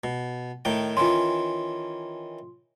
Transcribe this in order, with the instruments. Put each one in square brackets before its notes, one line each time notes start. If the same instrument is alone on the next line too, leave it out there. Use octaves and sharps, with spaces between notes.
[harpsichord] B2
A2 D#3 G5
[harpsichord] D#3 E3 C#4 [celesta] F4 C6